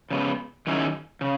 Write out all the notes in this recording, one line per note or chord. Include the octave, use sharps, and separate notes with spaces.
C#3 G#3 B3
D#3 F#3 C#4 E4 G#4
C#3